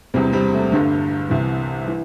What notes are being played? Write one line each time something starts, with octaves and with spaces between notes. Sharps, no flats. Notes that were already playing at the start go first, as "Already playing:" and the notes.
E1 E2 C3 G3 C4
G3 C4
A3
G1 G2 D3
C2 C3 E3
E3